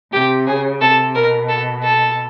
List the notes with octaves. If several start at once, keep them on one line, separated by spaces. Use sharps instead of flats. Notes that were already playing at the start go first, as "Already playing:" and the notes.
C3 G4
C#3 G#4
C3 A4
B2 A#4
A4
A4